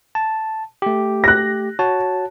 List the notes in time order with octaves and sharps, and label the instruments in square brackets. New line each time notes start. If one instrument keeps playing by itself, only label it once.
[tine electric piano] A5
A3 G4
[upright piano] F#6 A#6
[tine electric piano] F#4 C#5 A5